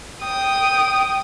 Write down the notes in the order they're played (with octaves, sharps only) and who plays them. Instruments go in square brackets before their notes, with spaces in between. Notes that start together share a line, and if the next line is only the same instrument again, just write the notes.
[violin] G5 D#6